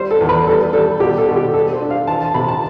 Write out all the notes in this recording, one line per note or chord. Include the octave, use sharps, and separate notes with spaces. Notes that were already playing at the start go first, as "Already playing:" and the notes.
Already playing: G3 C5
A4
E2
B4
G3 A4
G3 A4
B2 G4
A4
B2
G4
G3 A4
C5
D4
F5
E3 A5
A5
C3 B5
A5